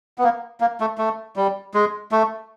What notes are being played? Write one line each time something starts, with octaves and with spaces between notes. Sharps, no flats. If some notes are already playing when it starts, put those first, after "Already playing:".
B3
A#3
A#3
A3
A3
G3
G#3
A3